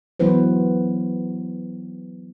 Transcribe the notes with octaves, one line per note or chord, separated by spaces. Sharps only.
E3 F#3 B3 E4 B4 C5